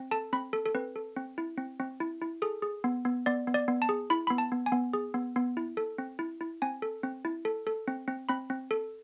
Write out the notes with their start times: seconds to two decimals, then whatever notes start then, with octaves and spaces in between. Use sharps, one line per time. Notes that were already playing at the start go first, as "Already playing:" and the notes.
Already playing: C4
0.11 A4 A5
0.33 C4 B5
0.53 A4
0.66 A4
0.75 C4 B4
0.96 A4
1.16 C4
1.38 E4
1.58 C4
1.80 C4
2.00 E4
2.22 E4
2.42 G#4 A4
2.62 G#4
2.84 B3
3.05 B3
3.26 B3 D5
3.47 B3
3.54 D5
3.68 B3
3.82 A5
3.89 G#4
4.10 E4 B5
4.27 B5
4.30 B3
4.38 A5
4.52 B3
4.66 G#5
4.72 B3
4.93 G#4
5.14 B3
5.36 B3
5.57 E4
5.77 A4
5.98 C4
6.19 E4
6.41 E4
6.62 C4 G#5
6.82 A4
7.03 C4
7.25 E4
7.45 A4
7.67 A4
7.88 C4
8.08 C4
8.29 C4 B5
8.50 C4
8.71 A4